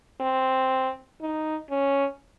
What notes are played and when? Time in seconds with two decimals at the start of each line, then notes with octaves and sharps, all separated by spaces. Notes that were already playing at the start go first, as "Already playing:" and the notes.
0.21 C4
1.21 D#4
1.71 C#4